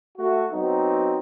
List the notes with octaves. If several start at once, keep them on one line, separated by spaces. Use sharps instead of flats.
A3 F#4
F#3 B3 C4 D#4